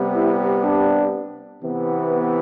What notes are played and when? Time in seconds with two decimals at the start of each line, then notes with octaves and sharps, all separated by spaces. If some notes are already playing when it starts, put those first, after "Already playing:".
Already playing: C3 G3 B3
0.14 E4
0.64 D4
1.63 C3 E3 B3